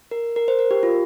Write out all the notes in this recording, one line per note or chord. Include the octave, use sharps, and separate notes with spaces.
A#4
A#4
C5
A#4
G4
F4